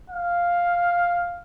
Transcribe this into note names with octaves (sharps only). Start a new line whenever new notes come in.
F5